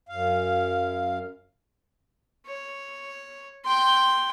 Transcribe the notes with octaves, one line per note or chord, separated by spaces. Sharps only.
F#2 F5
C#5
G5 C6